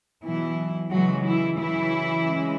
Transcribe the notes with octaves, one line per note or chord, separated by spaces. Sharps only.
B2 E3 F#3 E4
C#3 E3 F#3 G#3 F#4
E3 E4
C#3 E3 F#3 E4
C#3 G#3